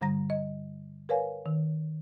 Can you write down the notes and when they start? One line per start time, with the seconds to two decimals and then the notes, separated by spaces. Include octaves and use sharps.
0.01 G2 D3 G3 A#5 A#6
0.30 D#5
1.09 A#4 B4 C#5 F5 G#5
1.46 D#3